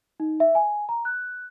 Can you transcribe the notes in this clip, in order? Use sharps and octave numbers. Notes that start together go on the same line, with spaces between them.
D#4
E5
G#5
A#5
F#6